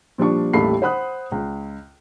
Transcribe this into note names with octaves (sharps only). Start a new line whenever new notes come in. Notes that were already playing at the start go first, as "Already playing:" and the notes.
A#2 F3 G3 D4 C#6
A1 D#2 G3 A3 B5 C7
C5 F#5 B5 D#6 F#6
C#2